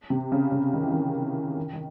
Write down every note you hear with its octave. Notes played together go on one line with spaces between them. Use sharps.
C3
C#3
C#3
D#3
E3
D#3
D#3
D#3